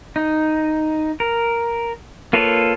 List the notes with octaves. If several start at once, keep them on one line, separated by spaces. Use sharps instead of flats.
D#4
A#4
A#3 F4 A4 B4 C#5